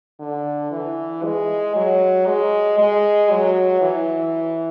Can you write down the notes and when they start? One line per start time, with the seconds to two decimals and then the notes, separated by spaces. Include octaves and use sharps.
0.20 D3
0.72 E3
1.24 G#3
1.76 F#3
2.26 G#3
2.78 G#3
3.30 F#3
3.81 E3